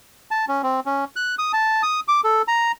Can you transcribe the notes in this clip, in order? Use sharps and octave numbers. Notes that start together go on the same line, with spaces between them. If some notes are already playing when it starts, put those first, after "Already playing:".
A5
C#4
C4
C#4
F#6
D#6
A5
D#6
D6
A4
A#5